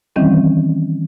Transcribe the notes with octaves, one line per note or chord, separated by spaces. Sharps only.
D#3 E3 G3 C4 C#4 E4